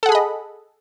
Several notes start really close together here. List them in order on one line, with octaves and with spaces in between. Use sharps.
A4 F#5 G#4 B5 D#5